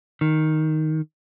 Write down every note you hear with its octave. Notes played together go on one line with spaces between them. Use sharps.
D#3